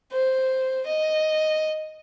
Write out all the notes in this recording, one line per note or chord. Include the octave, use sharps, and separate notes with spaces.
C5
D#5